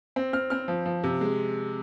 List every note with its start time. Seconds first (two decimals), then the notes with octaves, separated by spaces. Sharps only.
0.16 C4
0.33 C4 F6
0.50 C4 F6
0.68 F3
0.86 F3
1.04 C3
1.21 G#3